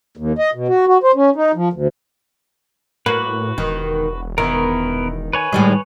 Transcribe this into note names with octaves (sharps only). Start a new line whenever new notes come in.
D#2
D#5
B2
F#4
F#4
C5
C#4
D#4
F3
D2
A2 A#3 F#4 B4
E1 D#3
D#3 B3 E4 A#4
B4 C#5 G#5
A2 D#3 G3 G#3